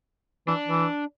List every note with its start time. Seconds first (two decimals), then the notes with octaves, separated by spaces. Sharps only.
0.47 E3 D4
0.67 E3